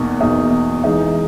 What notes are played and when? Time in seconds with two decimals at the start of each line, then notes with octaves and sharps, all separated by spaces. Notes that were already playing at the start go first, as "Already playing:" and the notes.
Already playing: E2 B2 A#3 D#4
0.21 E2 B2 A#3 D#4
0.84 E3 G#3 D#4